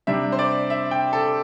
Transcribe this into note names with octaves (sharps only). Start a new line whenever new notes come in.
C3 G3 D4 E5
C5
D5
E5
G5
A4